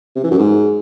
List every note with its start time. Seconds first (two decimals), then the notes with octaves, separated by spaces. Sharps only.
0.16 C3
0.23 E3
0.31 F#2
0.38 G#2